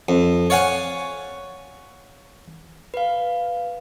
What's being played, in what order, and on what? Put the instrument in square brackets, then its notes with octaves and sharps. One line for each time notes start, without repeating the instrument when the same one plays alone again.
[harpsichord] F2
C#5 D5 F5 F#5 G#5
[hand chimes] B4 F5